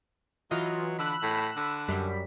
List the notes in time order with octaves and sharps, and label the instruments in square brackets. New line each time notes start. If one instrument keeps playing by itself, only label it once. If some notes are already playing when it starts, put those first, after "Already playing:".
[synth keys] E3 F4 D#5 [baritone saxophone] F#3
[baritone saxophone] D3 [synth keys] B5 E6 F#6
[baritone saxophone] A2
D3
[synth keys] F#2 G3 B6